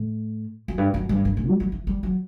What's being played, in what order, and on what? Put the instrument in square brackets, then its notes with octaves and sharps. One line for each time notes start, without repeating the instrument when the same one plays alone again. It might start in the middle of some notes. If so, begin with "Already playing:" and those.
Already playing: [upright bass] A2
F#2
G2
F#2
G2
G2
A2
G3
F#3
E3
G3
F#3